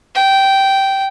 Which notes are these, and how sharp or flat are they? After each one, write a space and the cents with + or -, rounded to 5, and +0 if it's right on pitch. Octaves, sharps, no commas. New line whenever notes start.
G5 -10